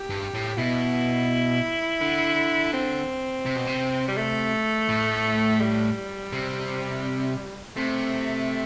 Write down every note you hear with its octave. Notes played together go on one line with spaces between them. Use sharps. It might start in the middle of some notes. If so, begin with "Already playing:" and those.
Already playing: G4
G2
A2
B2 E4
D3
C4
C3
B2
C3
G3
A3
A2
G3
C3
C3 A3